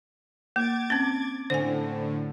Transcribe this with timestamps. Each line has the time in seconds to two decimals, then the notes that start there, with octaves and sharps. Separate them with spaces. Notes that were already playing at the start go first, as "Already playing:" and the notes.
0.56 A#3 D6 G#6 A6
0.90 C4 C#4
1.50 A2 D3 C5 G#5